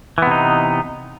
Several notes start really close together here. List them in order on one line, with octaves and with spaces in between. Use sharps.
E3 B3 C3 D#4